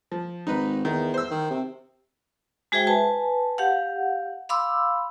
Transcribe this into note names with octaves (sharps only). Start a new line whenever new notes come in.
F3
G#1 D#4 B4
E2 D#3
C5 E6
D#3
C3
G#3 F#4 G#4 C5 E5 G5
B4 G#5 A5
G4 F5 F#5
F5 B5 C6 D6 E6